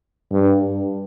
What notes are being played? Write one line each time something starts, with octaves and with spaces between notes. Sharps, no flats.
G2